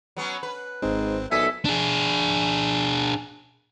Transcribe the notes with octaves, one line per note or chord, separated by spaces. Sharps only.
F#3 B3 C#4
B4
G#1 G#2 C4
B1 A2 A4 E5 G#5 D#6 B6
D4 G#4